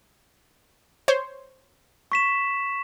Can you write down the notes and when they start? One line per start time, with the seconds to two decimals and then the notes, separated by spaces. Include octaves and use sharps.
1.08 C5 C#5
2.12 C#6 B6 E7